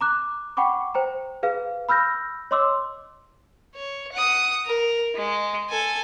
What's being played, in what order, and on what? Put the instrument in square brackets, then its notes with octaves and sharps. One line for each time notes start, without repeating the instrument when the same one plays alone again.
[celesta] A#5 D6 F#6
F#5 G5 B5 C#6 D6
C5 G5 A#5
G#4 B4 F5
B5 E6 F6 G6 A#6
C#5 D#5 C6 D6 E6
[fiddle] C#5
F#5 D#6
A#4
G#3
A4 G#5